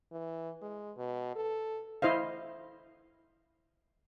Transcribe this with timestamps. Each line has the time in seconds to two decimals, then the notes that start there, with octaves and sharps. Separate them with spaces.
0.12 E3
0.62 G#3
0.97 B2
1.36 A4
2.02 E4 C5 D#5 F5